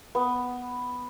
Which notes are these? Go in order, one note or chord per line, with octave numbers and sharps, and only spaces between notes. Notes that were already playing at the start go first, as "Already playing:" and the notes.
B3